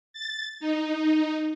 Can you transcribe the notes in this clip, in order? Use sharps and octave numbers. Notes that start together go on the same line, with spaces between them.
A6
D#4